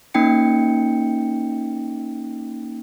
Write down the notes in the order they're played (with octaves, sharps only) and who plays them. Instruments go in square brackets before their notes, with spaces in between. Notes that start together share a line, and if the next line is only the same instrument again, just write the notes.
[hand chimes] A#3 C#4 D#4 G5 C#7